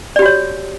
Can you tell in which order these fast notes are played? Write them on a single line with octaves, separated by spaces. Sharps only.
D5 G4 F#4 C#5